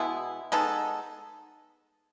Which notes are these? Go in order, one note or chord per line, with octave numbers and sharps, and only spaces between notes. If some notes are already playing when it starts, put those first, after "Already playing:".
Already playing: B2 G#3 B3 E4
G#3 B3 D#4 A4